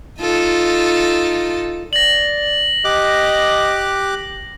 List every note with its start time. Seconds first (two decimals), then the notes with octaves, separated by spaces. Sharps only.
0.20 D#4 F4 A4
1.93 D5 A#6 F#7
2.85 G4 D#5 D6 F#6